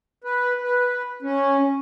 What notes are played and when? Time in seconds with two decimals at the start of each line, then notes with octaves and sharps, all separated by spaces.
0.24 B4
0.63 B4
1.22 C#4